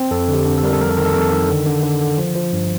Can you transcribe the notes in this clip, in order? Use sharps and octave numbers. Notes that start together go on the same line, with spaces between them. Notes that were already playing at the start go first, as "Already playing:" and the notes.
Already playing: C4
F2 A4
D3
G4
D3
A4
G3 A#4
A4
F2 A#4
A4
D#3 A#4
A4
F2 A#4
A4
D#3
D3
D3
D3
D3
F3
F3
G2